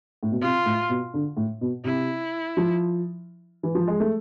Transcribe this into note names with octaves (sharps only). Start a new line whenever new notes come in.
A2
B2
C3 F4
A2
B2
D3
A2
B2
C3 E4
F3
E3
F3
G#3
A3